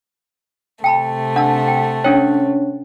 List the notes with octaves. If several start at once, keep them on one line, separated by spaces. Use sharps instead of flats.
C3 A3 G5 A5 B5
D4 F#5 A5 E6
G5
C#4 D4 C#5 G5